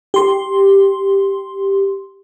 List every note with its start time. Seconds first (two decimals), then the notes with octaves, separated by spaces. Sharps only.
0.14 G4 C6